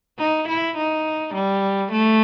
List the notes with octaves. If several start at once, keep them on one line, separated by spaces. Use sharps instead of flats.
D#4
E4
D#4
G3
A3